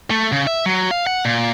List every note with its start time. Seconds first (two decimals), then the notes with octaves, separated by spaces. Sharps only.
0.10 A3
0.32 C#3
0.47 E5
0.66 F#3
0.91 F5
1.07 F#5
1.25 A#2